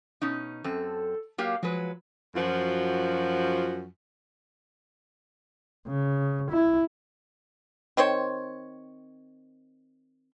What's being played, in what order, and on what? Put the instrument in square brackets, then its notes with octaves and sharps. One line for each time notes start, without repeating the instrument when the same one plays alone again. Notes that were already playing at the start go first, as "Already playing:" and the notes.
[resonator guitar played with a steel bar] B2 C#4 D#4
[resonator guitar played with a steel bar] F#2 C4 [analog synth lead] A4
[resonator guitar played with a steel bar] F#3 A#3 G4 [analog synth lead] F5
[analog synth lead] F3 [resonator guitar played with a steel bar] F#3 G#3 B4
[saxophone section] F#2 F3 F4 F#4
[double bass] C#3
E4
[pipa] D#3 C4 C5 C#5